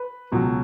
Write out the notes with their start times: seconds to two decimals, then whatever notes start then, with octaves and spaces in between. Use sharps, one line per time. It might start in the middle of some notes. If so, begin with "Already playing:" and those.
Already playing: B4
0.32 C#2 B2 F#3